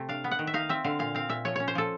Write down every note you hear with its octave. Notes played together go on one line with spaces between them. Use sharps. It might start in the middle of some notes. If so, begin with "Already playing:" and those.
Already playing: C3 A3
D4 F5
B3
F#5
D#3
E5
D#4 F5
C4 E5
D3 F5
A#2 F5
C4 F5
A#2 E5
F3 C#5
C#4 C#5
C5
F3 A4